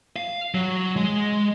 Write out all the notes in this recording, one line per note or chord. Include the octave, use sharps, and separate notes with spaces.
F5
F#3
G#3